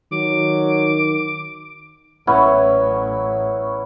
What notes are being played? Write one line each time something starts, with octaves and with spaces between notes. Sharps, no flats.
D#3 F#3 D6
A1 F#3 B3 C#4 E4